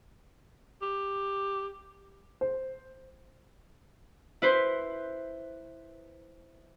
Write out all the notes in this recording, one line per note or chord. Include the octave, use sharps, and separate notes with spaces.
G4
C5
E4 B4 C5